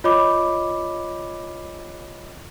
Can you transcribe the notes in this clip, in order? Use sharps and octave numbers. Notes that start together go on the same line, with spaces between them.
F4 C#5 D#5 B5 D6